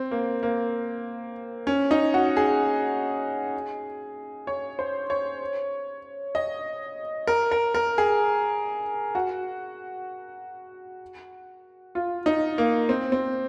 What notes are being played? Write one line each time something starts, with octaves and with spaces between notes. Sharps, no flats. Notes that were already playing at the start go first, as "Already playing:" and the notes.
Already playing: C4
A#3
A#3
C#4
D#4
F#4
G#4
C#5
C5
C#5
D#5
A#4
A#4
A#4
G#4
F#4
F4
D#4
A#3
C4
C4